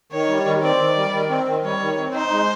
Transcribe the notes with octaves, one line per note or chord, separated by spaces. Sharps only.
D#3 C#5
G3
D#3
C4 D5
D#3
G3
D#3
C4
D#3
G3 C#5
D#3
C4
D#4 C5
G#3